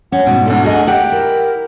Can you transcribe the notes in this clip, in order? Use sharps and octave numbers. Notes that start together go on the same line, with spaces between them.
C#4 F#5
G#2 B2
D2 A2 D3
G#4 D#5 G#5
G4 D5 F#5
E4 A#4